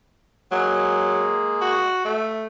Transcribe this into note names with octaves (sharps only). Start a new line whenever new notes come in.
F#3 G#3 A#3 G#4
F#4
A3